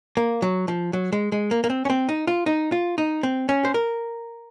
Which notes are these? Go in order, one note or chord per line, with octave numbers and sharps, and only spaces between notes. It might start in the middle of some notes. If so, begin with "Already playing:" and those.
A#3
F#3
F3
F#3
G#3
G#3
A#3
A#3
C4
C#4
C4
D#4
F4
D#4
F4
D#4
C4
C#4
C5
A#4